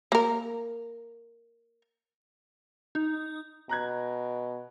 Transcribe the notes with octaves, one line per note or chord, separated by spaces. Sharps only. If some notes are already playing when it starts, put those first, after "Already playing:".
A#3 A#4
D#4
B2 A#5 F#6 G#6